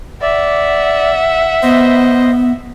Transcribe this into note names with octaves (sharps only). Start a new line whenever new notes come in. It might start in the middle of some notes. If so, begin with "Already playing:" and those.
D5 E5 F#5
B3 C5 D#5